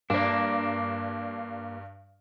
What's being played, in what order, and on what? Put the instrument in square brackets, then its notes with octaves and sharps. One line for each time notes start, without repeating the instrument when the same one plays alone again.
[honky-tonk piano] G2 D5 [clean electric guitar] A#3 D4